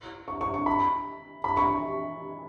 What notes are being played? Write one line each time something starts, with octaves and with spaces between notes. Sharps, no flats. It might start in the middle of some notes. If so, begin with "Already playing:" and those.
C#6
C#6
C#6
B5
B5
C#6